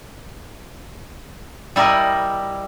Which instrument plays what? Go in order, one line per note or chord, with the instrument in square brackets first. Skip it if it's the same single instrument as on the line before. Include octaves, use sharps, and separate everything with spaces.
[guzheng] G3 E4 G4 A#4 D#5